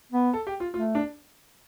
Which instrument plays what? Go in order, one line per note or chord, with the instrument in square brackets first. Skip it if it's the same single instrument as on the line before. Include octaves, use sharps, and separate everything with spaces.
[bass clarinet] B3
[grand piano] A4
G4
F4
[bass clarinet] A3 [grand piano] F4
[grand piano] D4